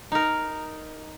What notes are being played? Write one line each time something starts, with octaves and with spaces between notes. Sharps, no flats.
D#4 A#4